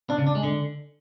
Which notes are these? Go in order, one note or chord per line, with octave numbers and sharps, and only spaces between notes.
D4
C#3
D4
G#3
D3